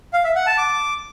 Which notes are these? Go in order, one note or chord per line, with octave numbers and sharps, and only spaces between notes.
F5
E5
F#5
A5
D6